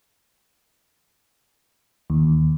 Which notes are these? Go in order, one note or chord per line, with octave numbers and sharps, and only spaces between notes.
D#2